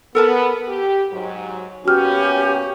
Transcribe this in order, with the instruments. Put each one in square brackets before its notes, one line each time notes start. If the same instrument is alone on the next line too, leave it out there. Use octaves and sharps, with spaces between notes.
[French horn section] B3 [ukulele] A4 A#4 A5
[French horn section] G4
G#2 F#3
[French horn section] A#2 B3 C#4 [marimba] F#4 F6 [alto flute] G4